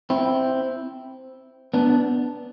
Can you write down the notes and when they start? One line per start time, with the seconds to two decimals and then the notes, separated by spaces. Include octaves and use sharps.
0.10 C4 E4
1.74 B3 D4